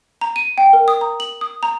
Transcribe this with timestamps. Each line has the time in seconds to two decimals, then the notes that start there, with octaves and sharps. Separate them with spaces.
0.21 A#5
0.36 D#7
0.58 G5
0.73 A#4
0.88 D#6
1.01 A#5
1.20 F#7
1.41 D#6
1.63 A#5